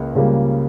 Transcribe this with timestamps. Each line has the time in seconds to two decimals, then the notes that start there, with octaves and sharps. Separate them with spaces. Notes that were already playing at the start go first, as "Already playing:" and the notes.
Already playing: C#2 C#3 A#3
0.15 C#2 C#3 G3 A#3